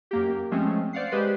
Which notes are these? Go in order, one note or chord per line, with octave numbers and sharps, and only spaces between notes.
F#2 A#3 G4
F3 G#3 A3 C4 C#4
C5 D5 F5 F#5 C7
G#3 G4 B4 C5 D5